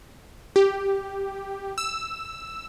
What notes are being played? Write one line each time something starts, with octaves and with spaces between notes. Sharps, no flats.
G4
E6